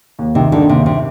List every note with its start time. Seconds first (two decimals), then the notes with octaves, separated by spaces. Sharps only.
0.19 D#2
0.35 C3 D#3
0.52 D3 D#3
0.69 D#2 C3
0.86 C3